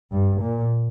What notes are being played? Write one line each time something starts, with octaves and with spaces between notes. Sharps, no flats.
G2
A#2